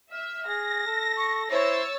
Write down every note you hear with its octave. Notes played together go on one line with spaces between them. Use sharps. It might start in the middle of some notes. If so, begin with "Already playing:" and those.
E5 F6
G#4 A#6
A4
C#6
E4 C5 C#5 E6 A6